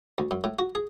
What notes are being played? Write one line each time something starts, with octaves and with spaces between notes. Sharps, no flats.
D2
F#2
A2
F#4
G#4